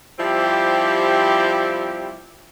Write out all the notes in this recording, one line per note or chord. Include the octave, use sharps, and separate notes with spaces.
F3 G3 C4 E4 G4